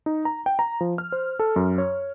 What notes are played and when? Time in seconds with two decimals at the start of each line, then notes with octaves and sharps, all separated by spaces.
0.06 D#4
0.25 A#5
0.46 G5
0.59 A#5
0.81 F3
0.98 F6
1.12 C5
1.39 A4
1.56 F#2
1.78 C#5